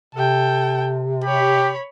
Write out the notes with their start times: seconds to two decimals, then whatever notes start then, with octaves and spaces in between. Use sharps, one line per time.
0.15 C3 A4 G5
1.24 G4 C#5 B5